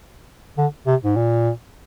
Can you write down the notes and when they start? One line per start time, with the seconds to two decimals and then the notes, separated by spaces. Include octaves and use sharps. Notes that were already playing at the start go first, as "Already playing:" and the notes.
0.58 D3
0.87 C3
1.04 G#2
1.16 A#2